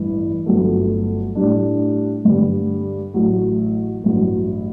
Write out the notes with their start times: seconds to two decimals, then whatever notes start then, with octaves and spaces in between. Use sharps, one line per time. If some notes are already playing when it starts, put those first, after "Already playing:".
Already playing: A1 G2 E3
0.46 G1 G2 F#3 A3
1.35 A2 G3 D4
2.25 G2 D3 G3
3.14 A1 A2 F#3
4.03 A1 G2 F#3